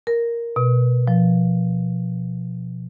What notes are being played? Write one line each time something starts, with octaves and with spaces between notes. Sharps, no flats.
A#4
B2
F3